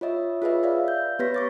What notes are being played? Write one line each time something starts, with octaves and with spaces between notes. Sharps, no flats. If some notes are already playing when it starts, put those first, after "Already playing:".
F4 C#5 D#5 E5
F4 G#4 B4 C#5 D#5 E5
D5 E5 F5
G6
B3 G4 B4 C#5 A#6 B6
C#6 D6 A6